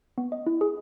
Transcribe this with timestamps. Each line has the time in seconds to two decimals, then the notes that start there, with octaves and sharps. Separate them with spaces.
0.18 B3
0.32 D#5
0.47 E4
0.61 G#4